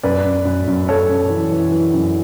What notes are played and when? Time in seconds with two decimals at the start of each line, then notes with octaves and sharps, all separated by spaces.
0.03 F#2 B4 D5
0.24 F#2
0.45 F#2
0.67 F#2
0.88 F#2 A4 C#5
1.09 F#2
1.30 E3
1.51 E3
1.72 E3
1.94 F#2